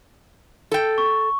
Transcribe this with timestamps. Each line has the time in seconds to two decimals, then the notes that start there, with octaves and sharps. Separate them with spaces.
0.72 A4 G5
0.98 C#6